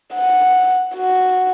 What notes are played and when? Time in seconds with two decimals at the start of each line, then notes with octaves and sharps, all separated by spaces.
0.15 F#5
0.95 F#4